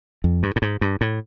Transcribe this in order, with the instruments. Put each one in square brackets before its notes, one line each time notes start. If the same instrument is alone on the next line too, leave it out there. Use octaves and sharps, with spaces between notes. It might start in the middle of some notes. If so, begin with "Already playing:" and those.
[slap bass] F2
G2
A2
G#2
G2
A2